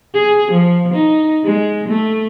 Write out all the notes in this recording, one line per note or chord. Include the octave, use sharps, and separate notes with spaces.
G#4
F3
D#4
G#3
A3